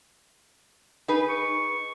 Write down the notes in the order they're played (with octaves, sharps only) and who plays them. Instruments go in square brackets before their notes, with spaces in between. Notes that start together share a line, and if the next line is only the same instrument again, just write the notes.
[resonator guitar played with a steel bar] D#4 G#4 B4
[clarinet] C#6